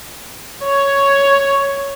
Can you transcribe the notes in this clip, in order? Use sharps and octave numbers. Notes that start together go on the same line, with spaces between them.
C#5